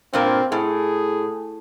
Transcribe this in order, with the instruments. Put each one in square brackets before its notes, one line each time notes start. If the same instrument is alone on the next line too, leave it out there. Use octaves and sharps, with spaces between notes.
[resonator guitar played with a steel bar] G2 A#2 A#3 [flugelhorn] C4
[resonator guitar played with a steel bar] A2 [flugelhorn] G#4